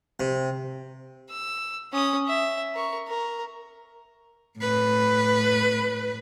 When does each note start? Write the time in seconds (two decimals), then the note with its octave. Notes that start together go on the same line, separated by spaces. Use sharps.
0.20 C3
1.30 E6
1.92 C#4 D#6
2.28 E5
2.75 A#4 C#6
3.08 A#4
4.58 A2 B4